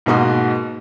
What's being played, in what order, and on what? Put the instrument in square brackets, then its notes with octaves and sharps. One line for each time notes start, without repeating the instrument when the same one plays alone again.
[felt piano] G#2 B2 A#3 F#4 D#6